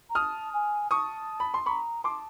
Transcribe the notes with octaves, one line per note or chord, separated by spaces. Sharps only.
A#5
A5 D#6 F6
G#5
A5 C#6 D#6
B5
C6
A#5 B5 C#6
A5 C6 D6